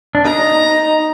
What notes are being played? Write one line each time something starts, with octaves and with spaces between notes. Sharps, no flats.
D4
D#4 A#5